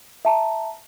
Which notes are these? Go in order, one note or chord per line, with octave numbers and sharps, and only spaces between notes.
E5 A5 A#5